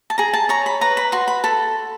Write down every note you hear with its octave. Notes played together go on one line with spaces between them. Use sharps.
A5
G#4 A#5
A5
C#5 A#5
B5
B4 A#5
B5
F#4 C6
B5
A4 B5